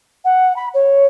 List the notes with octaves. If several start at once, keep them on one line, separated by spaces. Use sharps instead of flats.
F#5
B5
C#5